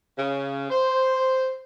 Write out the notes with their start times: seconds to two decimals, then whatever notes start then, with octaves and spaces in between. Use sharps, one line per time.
0.17 C#3
0.70 C5